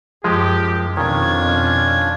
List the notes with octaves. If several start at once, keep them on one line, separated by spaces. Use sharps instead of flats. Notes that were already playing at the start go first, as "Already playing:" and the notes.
F#2 F3 G#3 G4
F2 B2 D#3 C#4 D4 F4 G#6